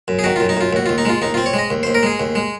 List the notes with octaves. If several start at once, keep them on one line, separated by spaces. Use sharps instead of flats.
F#2
G#4
D#3 F#4
F4
F#2
D#4
F#2 F4
D#2 F#4
F4
D#2
D#4
G#3 F4
D#2 D#4
C4 F4
C#5
G#3 D#5
D#2
C5
D#2
A#4
G#3 G#4
D#2
G#3